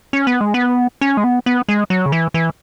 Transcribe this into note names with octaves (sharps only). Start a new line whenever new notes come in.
C#4
B3
G#3
B3
C#4
G#3
B3
B3
G#3
F#3
C#3
E3
E3